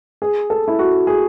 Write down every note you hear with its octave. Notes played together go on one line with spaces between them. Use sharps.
G#4
A4
E4
F#4
G#4